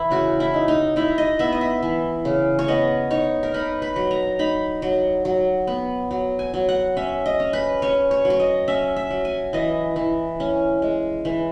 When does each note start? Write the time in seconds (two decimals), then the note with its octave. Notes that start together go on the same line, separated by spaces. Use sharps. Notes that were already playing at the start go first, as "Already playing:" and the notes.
Already playing: E3 E4
0.11 C#3 F#4
0.40 E4
0.54 D#4
0.68 D#4
0.96 D#4 E4
1.18 D#5
1.39 B3 E5
1.52 D#5
1.61 E5
1.83 E3
2.25 C#3
2.59 C#5
2.68 B3 D#5
3.10 D#4 C#5
3.43 A#4
3.54 D#4 B4
3.82 B4
3.96 F#3
4.11 A#5
4.39 D#4 B5
4.82 F#3
5.25 F#3
5.67 B3
6.11 F#3
6.39 G#5
6.54 F#3
6.69 F#5
6.97 C#4 E5
7.26 D#5
7.40 C#4
7.53 B4
7.82 C#4 C#5
8.11 C#5
8.25 F#3
8.30 C#5
8.40 D#5
8.68 C#4 E5
8.96 E5
9.11 F#3
9.25 G#5
9.53 E3 D#5
9.96 E3
10.40 C#4
10.82 G#3
11.25 E3